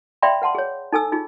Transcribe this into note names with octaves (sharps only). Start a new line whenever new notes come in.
D5 E5 F5 G5 B5 C6
B4 F#5 A5 C6
G#4 C#5
D#4 A4 G#5 E6
D#4 F4 G#4